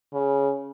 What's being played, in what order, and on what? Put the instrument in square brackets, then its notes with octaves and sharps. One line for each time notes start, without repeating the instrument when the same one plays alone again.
[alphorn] C#3